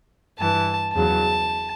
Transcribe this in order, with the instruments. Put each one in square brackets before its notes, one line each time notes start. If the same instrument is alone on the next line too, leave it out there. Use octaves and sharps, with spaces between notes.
[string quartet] G2 E3 A5
E2 C#3 F#3 A5